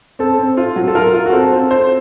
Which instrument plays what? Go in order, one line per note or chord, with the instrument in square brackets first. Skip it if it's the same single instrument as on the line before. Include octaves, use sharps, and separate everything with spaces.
[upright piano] C4 [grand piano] A4
[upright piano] C4
F4
F#3
[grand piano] A4
[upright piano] F4 [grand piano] A#4
[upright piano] F4
[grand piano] F#4
[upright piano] C4 [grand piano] A4
[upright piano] C4
C5